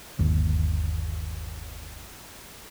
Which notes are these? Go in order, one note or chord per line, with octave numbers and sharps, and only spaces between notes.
G1 D#2